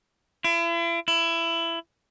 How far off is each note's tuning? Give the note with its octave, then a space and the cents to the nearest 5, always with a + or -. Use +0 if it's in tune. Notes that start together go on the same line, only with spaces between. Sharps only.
E4 +40
E4 +20